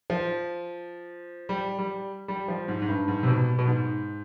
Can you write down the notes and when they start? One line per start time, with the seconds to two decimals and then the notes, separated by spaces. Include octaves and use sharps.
0.10 F3
1.49 G3
1.79 G3
2.28 G3
2.48 F3
2.68 G#2
2.82 G#2
2.88 G2
3.08 G#2
3.23 C3
3.28 B2
3.59 B2
3.67 G#2